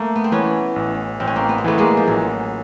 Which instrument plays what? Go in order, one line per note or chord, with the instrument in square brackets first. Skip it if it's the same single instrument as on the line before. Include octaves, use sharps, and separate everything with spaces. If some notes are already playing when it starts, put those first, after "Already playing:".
Already playing: [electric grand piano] A3 [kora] A#3
[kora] B3
C4
[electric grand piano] E3 [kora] B3 C#4
[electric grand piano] A1
[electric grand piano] A1 [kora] C4
[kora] C#4
A#3 C4
B3
C4
[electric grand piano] E3 [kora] A3 B3
[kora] G#3 A#3
F3
[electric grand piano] A1 [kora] F#3